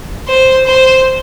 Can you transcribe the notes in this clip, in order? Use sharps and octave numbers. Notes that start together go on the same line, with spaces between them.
C5
C5